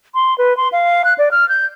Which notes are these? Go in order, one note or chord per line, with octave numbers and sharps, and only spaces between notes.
C6
B4
C6
F5
F#6
D5
F6
G6